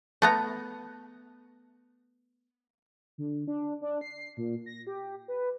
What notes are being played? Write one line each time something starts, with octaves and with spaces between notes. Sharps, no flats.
A3 B3 A#5
D3
D4
D4
C7
A#2
A#6
G4
B4